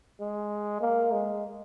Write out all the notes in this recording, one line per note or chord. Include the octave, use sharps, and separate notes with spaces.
G#3
A#3
G#3